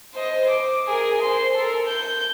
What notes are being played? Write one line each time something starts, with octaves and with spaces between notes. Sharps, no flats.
C5 D#5
D6
G#4 A#4
C5 C6
A4 A#4
G6